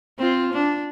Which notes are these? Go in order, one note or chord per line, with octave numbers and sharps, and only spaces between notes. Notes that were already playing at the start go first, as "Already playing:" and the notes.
C4 F4
D4